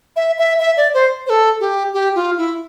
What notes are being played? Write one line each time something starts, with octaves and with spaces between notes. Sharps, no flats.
E5
E5
E5
D5
C5
C5
A4
G4
G4
F4
E4